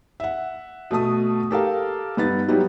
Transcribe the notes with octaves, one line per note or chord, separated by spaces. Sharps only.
E5 F#5
B2 A3 A5 D#6
G4 A4 A#4 F5
G2 B3 D#4 A6
F#3 G3 B3 D#4 E4